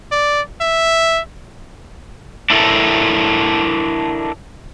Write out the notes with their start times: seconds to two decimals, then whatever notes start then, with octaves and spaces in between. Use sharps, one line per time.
0.12 D5
0.61 E5
2.50 D4 E4 A4 A#4